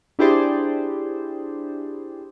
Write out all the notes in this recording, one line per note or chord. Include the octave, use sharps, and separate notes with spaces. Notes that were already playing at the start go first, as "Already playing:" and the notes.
D4 E4 G4 G#4 C5 D5